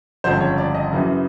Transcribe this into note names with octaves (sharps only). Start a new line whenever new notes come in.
G1 F2 C#3 F3 G#3 C5
C#5
D5
D#5
F#2 C#3 E3